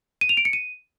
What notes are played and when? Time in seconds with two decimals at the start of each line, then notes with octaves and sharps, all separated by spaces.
0.21 D#7
0.29 F7
0.37 D7
0.45 C#7
0.53 D#7